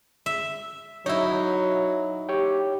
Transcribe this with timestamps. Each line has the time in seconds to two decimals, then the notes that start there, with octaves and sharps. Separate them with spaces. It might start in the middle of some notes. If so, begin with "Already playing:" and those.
0.26 E5
1.06 F#3 D#4 E4 C#5 E5
2.29 G4 C#5 G5